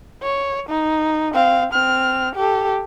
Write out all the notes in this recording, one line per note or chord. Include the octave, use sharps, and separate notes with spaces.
C#5
D#4
C4 F5
C4 F6
G4 A4